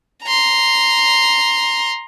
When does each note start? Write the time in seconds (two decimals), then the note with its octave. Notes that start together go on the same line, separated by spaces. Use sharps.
0.23 A#5 C6